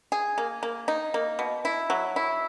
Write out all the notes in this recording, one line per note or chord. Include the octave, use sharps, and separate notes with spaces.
G#4
A#3
A#3
D#4
A#3
B2
E4
F#3
E4